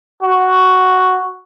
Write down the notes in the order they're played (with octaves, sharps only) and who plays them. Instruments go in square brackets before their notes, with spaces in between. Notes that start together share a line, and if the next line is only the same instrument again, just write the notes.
[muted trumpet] F#4